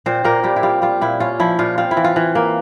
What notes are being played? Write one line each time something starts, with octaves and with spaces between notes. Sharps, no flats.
A#2 C4 C5
A#2 A#3 A#4
A#2 G3 G4
E4
G3 F4
G3 F4
A#2 E4
C#4 F4
F3 E4
A#2 F4
C4 F4
E4
E3
F4
E3
A#3